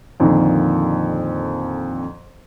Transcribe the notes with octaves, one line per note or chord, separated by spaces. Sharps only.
F2 A#2 D3 D#3